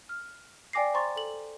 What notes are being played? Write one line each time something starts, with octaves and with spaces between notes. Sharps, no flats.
F6
D5 G5 G#5 D6 A#6 C7
C5 A#5 C6 C#6 A6
A4 F#7